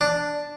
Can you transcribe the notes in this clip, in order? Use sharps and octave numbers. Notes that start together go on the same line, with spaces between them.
D4